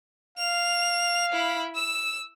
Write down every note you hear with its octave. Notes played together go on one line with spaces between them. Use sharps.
F5 F7
E4 B5
E6 E7